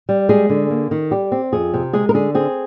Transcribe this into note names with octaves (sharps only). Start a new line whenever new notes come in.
G3
G#3 G#4
D3
A#3
D#3
G3 G4
C4
F2 G#4
C3
G#3 G#4
A#4
D3 G#4
C4 G#4